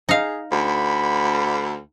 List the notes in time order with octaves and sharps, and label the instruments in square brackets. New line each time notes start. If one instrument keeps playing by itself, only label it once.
[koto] D#4 F5 [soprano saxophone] G#4
[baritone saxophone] D2 [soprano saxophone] B5